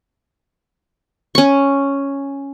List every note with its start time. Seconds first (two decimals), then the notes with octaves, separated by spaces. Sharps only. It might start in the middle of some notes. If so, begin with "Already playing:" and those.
1.35 C#4 C#6